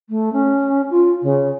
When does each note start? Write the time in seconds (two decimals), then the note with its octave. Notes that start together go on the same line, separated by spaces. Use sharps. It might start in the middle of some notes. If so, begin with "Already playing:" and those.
0.09 A3
0.33 C#4
0.91 F4
1.23 C#3